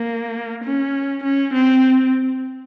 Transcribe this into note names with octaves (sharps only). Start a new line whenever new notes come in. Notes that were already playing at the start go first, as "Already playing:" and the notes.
Already playing: A#3
C#4
C#4
C4